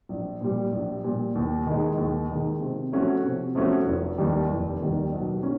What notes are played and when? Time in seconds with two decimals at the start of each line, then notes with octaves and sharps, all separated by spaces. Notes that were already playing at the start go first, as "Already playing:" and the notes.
0.09 A#1
0.41 A#2 G3
0.72 A#1
1.04 A#2 G3
1.35 D#2
1.66 D#3 G#3
1.98 D#2
2.28 D#3 G#3
2.60 C3
2.92 F3 A3 C#4 F#4
3.23 C3
3.55 F3 A3 C#4 F#4
3.86 F1
4.18 D#2 D#3 G3
4.50 F1
4.81 D#2 D#3 G3
5.12 B1
5.43 C#4